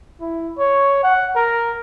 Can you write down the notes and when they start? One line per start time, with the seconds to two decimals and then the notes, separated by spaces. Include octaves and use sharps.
0.20 E4
0.58 C#5
1.03 F#5
1.35 A#4